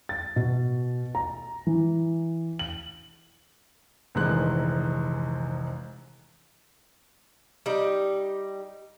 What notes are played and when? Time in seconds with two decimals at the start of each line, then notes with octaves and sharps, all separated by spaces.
0.09 A6
0.36 B2
1.15 A#5
1.67 E3
2.59 F#7
4.15 F1 A#1 D#3 E3 G#3 F#6
7.66 G3 D#4